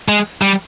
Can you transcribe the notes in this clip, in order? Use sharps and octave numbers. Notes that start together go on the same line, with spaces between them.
G#3
G3